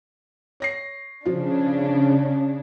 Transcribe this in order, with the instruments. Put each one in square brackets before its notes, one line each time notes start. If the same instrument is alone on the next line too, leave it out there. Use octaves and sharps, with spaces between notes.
[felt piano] C#5 A#6 C7
[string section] C#3 D4 [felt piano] F3 F4